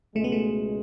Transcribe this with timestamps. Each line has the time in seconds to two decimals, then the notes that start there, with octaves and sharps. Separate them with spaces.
0.16 C#2 B2 G#3 A3
0.24 B3
0.32 A3